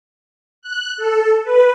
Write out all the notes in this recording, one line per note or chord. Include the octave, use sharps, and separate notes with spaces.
F#6
A4
B4